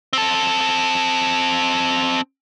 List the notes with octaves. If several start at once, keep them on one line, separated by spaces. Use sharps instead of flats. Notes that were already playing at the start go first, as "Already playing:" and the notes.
C4 A4